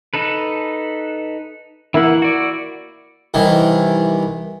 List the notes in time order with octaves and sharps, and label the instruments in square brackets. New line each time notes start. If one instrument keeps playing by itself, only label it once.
[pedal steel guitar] D#4 A4 B4
[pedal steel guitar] E3 F#5 [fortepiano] A#3 E4
[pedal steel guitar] F#4 D5
[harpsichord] C2 D#3 E3